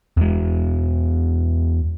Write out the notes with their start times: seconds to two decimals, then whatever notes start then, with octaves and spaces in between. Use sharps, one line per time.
0.17 E2 G#3